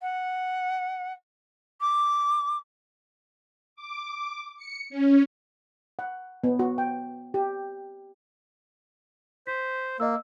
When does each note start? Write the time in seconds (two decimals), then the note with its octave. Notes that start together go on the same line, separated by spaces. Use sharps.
0.02 F#5
1.81 D6
3.76 D6
4.57 C#7
4.90 C#4
5.99 F#5
6.44 B3
6.59 F#4
6.78 G5
7.34 G4
9.47 C5 B6
10.00 A#3 D#5 E6